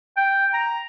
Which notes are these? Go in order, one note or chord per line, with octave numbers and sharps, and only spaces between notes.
G5
A#5